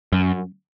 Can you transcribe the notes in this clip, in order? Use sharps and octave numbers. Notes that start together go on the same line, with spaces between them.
F#2